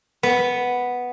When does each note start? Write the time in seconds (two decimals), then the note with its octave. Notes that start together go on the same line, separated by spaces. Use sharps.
0.23 B3